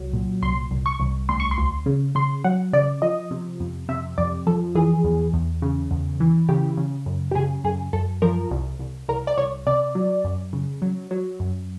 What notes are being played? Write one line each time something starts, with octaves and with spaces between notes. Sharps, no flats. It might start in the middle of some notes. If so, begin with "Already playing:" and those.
Already playing: C2 F#3
A#2
C2 C6
C2
C#6
C2
D2 C6
C#6
C6
D2
C#3
C#3 C6
F#3 F#5
C#3 D5
F3 D#5
C3
F2
C3 E5
F2 D5
F3 A4
E3 G#4
E2
E2
C#3
E2
E3
C#3 G4
C#3
F#2
G4
C#3 G#4
F#2 G#4
F#2 A4
F3 A#4
C2
C2
C2 A#4
D5
C2 C#5
C3 D5
F#3
F#2
C#3
F#3
F#3
F#2